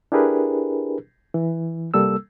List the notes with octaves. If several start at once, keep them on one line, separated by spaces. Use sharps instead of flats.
D4 E4 G4 G#4 A#4 B4
E3
C2 G3 A#3 A4 E6